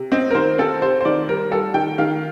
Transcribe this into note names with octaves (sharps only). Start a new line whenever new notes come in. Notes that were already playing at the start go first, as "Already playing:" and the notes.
Already playing: C3
C4 D#5
A#4
D#3 C5
C4 A4
C3 C5
C5
D#3 D5
G3 A#4
G3 A4
D#3 G5
D#3 F5